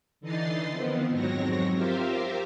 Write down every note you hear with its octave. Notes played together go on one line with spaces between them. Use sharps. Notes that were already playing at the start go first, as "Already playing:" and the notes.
D3 E3 D#4 D#5 A6 C7
D#3 F3 B3 C4
F2 G#2 F#3 C4 C#5 A#6
F4 G4 A#4 C5 E5 F5